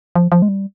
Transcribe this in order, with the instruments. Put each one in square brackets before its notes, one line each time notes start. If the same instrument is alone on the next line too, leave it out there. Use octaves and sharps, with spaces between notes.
[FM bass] F3
F3
G#3
G3